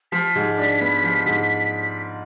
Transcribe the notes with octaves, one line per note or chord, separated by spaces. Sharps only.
F3 B6
G#2
D4
B3
F3
G#2